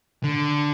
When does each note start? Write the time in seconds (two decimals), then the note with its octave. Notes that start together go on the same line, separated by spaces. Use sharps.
0.24 D3